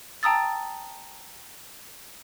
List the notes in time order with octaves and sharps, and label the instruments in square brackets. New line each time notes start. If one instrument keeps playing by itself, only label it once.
[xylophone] G5 A5 A#5 D#6 E6 A6